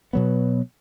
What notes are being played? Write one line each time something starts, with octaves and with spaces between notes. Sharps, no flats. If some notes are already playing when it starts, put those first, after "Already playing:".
B2 F#3 B3